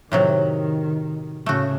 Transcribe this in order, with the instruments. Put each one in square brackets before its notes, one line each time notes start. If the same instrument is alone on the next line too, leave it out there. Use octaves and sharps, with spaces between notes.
[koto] A2 C3 F#3 [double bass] D#3
[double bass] A2 C#3 [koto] A3 F#4